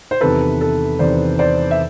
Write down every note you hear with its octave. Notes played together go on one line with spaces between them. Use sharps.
C5
E2 C3 D#3 A4 B4
A4
E2 C3 D#3 C5 D5
C5 D5
E5